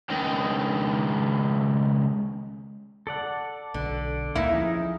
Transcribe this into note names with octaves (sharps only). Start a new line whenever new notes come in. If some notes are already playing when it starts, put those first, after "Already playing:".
C#2 D#3
A4 D5 F#5
B1 D3
D2 A#3 D#4 E4
F3 C#4 D#4 G#4